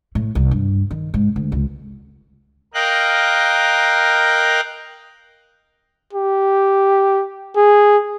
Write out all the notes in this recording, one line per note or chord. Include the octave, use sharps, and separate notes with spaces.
A2
C2
G2
D#3
G#2
D2
C#2
A#4 D#5 F5 G5 F#6
G4
G#4